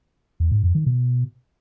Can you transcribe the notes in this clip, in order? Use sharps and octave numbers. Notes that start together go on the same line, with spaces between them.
E2
G#2
F2
D#3
B2